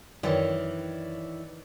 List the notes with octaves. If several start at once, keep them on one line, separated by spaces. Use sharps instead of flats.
F#2 D#3 E3 C#5 D5